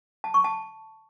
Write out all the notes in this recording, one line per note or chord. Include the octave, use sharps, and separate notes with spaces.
A5
C#6
A5